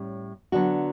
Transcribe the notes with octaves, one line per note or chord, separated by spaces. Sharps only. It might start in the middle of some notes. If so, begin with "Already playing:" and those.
Already playing: A2 G3 C#4
D3 F#3 B3 D4 F#4